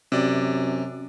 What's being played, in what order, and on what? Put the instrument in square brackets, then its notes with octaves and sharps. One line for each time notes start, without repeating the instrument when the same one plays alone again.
[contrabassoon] F#2 [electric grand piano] C3 D5